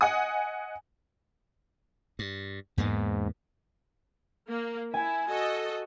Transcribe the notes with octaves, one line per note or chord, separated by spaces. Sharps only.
D#5 F#5 G#5 D#6
G2
E2 G#2 A#3 B3
A#3
E4 G#5
F#4 A4 D#5